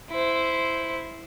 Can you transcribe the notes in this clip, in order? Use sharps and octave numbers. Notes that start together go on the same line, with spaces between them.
E4 C5